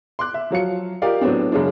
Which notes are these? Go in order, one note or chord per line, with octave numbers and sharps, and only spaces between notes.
C6 D6 F#6
E5
F3 F#3 F5 C#7
F4 G4 A#4 D5 D#5 F5
A2 F#3 B3 C4 D4
F#2 C#3 G#3 C#4 D4